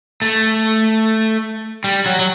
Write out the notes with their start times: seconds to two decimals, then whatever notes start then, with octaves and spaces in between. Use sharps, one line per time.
0.22 A3
1.84 G3
2.06 F#3
2.19 F#3